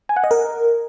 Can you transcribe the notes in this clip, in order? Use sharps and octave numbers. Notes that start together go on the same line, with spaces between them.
G#5
F#5
D#5
A#4